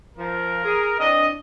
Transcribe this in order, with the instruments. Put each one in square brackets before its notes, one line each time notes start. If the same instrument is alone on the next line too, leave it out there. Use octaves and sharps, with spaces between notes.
[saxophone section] F3 [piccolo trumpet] A#4
[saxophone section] G#4
[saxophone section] E3 C4 D4 [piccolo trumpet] D#5